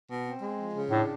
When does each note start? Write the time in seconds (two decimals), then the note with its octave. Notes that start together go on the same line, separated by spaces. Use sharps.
0.09 B2
0.25 C4
0.41 G#3
0.58 F3
0.74 C#3
0.91 A2 D4